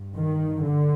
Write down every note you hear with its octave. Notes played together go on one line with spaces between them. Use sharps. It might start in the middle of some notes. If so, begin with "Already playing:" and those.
Already playing: G2
D#3
D3